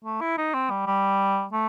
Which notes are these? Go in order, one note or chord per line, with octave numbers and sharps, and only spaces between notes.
A3
E4
D#4
C4
G3
G3
A3